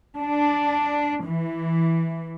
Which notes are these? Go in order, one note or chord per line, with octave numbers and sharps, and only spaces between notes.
D4
E3